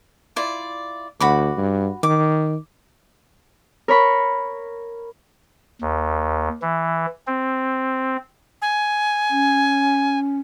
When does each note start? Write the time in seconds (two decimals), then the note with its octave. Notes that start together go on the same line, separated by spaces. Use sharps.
0.36 E4 F4 D5
1.20 D2 F#4 B5 D6
1.57 G2
2.03 D#3 D6
3.88 A#4 C#5 B5 C#6
5.81 D#2
6.62 E3
7.27 C4
8.62 G#5
9.30 C#4